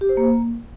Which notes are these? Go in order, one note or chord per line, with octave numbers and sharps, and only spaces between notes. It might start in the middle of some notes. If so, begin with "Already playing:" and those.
G4
C5
A#3